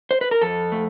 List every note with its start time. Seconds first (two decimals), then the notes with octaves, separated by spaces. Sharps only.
0.11 C5
0.21 B4
0.31 A#4
0.42 F2 A4
0.72 A3